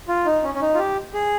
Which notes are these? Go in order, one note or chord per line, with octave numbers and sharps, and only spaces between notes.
F4
D#4
C#4
C#4
D#4
F4
G4
G#4